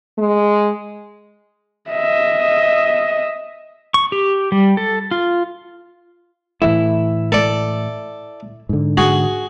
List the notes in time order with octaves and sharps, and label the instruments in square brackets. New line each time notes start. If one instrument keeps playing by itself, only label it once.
[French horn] G#3
[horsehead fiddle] D#5 E5
[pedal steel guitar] C#6
G4
G3
A4
F4
[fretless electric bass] A2 E3 A3 [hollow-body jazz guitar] E4
[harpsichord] A4 D5
[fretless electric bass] G#2 D3
[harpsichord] F#4 G#4